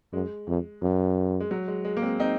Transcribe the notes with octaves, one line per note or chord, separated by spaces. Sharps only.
F#2 G#3
F2
F#2
G#3
F#3
G#3
G#3
A#3
G#3 C4
C4 D#4